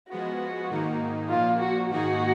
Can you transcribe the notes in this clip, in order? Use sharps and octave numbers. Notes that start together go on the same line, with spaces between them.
F3 G#3 B3 F#4
G#2 D#3 A#3 D#4
A#2 F3 A#3 F4
F#4
G#2 D#3 A#3 D#4 F#4 G#4